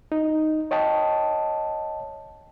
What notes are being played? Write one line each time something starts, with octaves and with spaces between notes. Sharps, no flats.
D#4
C#5 D#5 G5 A5